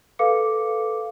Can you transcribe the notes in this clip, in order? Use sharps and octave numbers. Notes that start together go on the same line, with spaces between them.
A4 B4 F5 D6 C#7